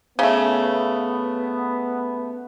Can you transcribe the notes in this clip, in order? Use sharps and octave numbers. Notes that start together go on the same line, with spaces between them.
C#3 A3 B3